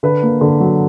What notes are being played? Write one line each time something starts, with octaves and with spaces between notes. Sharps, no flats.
D3 B4
A#3
D3
F#3